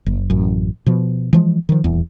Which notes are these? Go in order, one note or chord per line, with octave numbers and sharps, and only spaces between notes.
F#1
A1 F#2
B2 F3
E3 F3 G#3
D#3 F3
D#1 E2